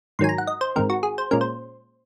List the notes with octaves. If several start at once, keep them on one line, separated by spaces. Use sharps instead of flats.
G#2 D#3 F#3 G#5 C6
A#5
F#5
D#5
C5
G#2 D#3 G#3 C4 A#4
F#4
G#4
C5
A#2 G#3 C#4 A#4
C5